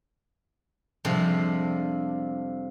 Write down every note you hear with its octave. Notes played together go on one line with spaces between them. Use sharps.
F2 C3 F3 G3 G#3 D4